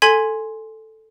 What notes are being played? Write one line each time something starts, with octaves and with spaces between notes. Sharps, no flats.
A4 G#5 C6 G#6 B6 D#7